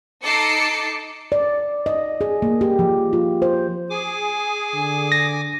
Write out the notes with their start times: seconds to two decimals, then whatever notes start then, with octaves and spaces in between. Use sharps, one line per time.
0.22 D#4 A4 D6 C7 C#7
1.32 D5
1.86 D#5
2.21 G#4
2.42 A#3
2.61 G4
2.79 F3
3.13 F4
3.42 C5
3.90 G#4 G#5 D6
4.74 D3
5.12 A#6